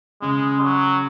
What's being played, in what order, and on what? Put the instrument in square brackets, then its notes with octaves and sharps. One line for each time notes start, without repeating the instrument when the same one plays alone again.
[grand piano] C#3 [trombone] G#3
[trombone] F#3